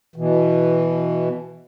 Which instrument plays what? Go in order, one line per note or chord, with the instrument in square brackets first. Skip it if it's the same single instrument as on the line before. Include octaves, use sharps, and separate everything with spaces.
[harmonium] B2 E3